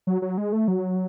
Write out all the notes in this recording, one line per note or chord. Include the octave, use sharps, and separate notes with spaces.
F#3
F#3
G#3
A3
F#3